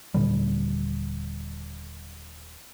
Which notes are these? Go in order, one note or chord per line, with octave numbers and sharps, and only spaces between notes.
D#1 A#2 D3 G3